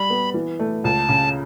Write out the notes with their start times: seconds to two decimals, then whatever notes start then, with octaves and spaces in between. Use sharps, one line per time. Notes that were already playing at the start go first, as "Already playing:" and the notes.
Already playing: G3 B5
0.10 B3
0.34 E3
0.59 A3
0.84 C#2 A5
1.09 C#3